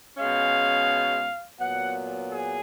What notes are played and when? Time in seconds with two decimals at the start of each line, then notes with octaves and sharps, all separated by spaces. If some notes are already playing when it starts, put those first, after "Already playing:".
0.16 B2 G#3 C#4 F5
1.59 A#2 F#3 B3 F#5
2.32 G#4